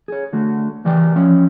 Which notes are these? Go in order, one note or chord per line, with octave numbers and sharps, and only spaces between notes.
G#4 C#5
D3 A3 F#4
C#3 E3 G3 D5 G5
F3 C#4 C#5